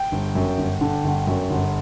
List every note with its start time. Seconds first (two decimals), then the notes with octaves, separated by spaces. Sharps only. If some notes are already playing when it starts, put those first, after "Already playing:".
Already playing: G5
0.12 G1
0.35 F#2
0.58 G1
0.81 D3
1.04 G1
1.27 F#2
1.50 G1